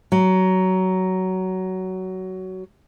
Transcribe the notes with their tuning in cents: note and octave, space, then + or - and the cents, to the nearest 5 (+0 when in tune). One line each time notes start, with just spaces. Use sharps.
F#3 +15